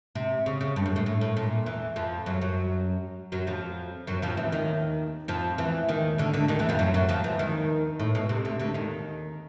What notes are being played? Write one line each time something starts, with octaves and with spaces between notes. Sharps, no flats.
C3
C#3
C#3
G2
F#2
A2
A2
A2
A#2
E2 E3
F2 F3
F#2 F#3
F#2 F#3
F#2 F#3
F2 F3
F#2 F#3
F2 F3
E2 E3
D#2 D#3
F2 F3
E2 E3
D#2 D#3
D2 D3
D2 D3
D#2 D#3
E2 E3
F2 F3
F#2 F#3
F#2 F#3
F2 F3
E2 E3
D#2 D#3
A2
B2
C3
D2 D3
D2 D3
D#2 D#3